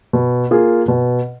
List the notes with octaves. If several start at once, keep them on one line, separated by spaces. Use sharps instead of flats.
B2
A#3 F4 G#4
B2